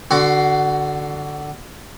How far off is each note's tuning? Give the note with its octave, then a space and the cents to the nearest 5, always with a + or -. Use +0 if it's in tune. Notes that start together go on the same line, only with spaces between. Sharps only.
D3 +0 F#4 +20 C6 +0